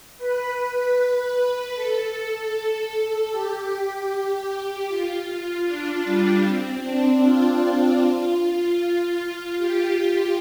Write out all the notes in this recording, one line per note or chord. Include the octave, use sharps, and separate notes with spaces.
B4
A4
G4
F4
D4
G3
C4
D4
F4
G4